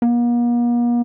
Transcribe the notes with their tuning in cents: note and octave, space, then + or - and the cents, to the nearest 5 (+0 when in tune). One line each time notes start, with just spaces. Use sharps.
A#3 +45